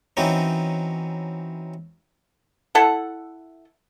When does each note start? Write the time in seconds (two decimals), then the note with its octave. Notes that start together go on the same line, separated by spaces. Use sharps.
0.17 E3 F#3 C4 C#4 D#4
2.75 E4 A4 F#5